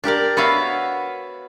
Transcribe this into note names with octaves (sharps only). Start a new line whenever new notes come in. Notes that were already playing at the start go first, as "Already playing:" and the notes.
D4 G4 A#4 D5
B3 F#4 B4 C#5 E5 F5